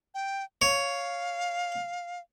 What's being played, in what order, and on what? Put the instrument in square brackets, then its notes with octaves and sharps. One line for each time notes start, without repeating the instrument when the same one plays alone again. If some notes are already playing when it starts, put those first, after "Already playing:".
[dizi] G5
[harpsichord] C#5 [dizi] F5